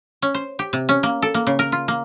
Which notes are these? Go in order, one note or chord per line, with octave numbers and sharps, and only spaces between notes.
C#4
C5
G4
C3
C#4
A#3
A4
A#3
C#3
A#4
F4
A#3